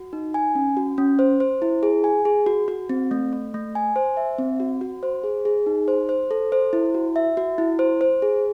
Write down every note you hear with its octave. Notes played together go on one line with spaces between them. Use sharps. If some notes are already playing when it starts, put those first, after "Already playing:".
Already playing: F#4
D#4
G#5
C#4
F#4
C#4
C5
C5
E4
G#4
G#5
G#4
F#4
F#4
C4
A3
A3
A3
G#5
C5
E5
C4
F#4
F#4
C5
G#4
G#4
D#4
C5
C5
A4
C5
E4
F#4
E5
F#4
E4
C5
C5
G#4